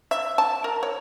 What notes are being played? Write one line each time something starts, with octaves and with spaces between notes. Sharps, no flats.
E5
A5
A#4
C#5